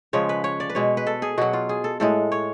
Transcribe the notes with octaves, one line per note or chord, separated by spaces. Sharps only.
C#3 F3 G#3 C#5
B4
C#5
D5
B4
B2 G#3 C#5
B4
A4
G#4
B2 F#3 F#4
F4
G#4
A4
A2 G#3 A4
C#5